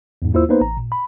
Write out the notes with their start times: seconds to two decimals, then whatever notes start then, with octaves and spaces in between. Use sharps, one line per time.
0.22 E2 G#2
0.34 D#2 A#3 E4 F4 C5 E6
0.49 A#3 B3 D#4 B4 C5
0.61 A1 A#5
0.77 A#2
0.92 B5